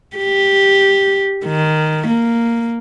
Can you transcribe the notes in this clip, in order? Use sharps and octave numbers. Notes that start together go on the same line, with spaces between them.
G4
D#3
A#3